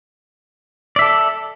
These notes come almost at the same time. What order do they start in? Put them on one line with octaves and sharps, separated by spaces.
D5 E5 A4